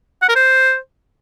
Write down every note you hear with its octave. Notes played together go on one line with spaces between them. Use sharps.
F#5
A#4
C5